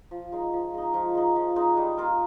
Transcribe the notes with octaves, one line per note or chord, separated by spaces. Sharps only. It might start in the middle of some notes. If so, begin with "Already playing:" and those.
F3
G#3 D#4
F3
G#3 D#4
F3
G#3 D#4
F3
G#3 D#4
G3
A#3 F4 A#4